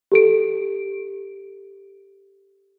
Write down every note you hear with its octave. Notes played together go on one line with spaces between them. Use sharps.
G4 A4 D7